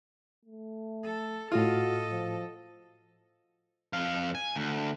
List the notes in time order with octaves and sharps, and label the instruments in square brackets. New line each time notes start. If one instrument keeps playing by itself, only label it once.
[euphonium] A3
[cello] A4
[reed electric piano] A2 F6 [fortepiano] F4 [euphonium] F#4 [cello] A4 D#5
[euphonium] F3
[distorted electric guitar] F2 F5
G#5
D2